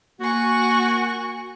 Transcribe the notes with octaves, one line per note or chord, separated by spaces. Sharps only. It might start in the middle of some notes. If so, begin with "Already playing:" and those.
A#3 F#4 G#5 C#6